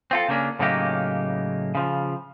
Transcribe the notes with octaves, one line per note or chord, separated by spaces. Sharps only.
C4 F4 A4
C#3 A#3 C#4 D4
A2 C#3 F#3 A#3 D#4 G4
C#3 F3